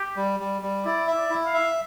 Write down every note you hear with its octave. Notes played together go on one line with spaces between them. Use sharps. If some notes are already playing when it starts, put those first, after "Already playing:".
Already playing: G4
G3
G3
G3
E4 D5
E5
D5
E4
F5
E5